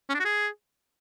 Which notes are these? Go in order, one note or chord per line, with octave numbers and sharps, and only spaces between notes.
C#4
D4
F#4
G#4